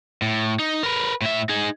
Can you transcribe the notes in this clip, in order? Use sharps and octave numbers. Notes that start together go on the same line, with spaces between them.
A2
D#4
A#4 B4
A2 E5
D#4 G#4